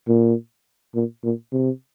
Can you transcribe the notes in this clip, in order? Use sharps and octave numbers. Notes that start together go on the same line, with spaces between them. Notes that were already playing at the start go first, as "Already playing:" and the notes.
A#2
A#2
A#2
C3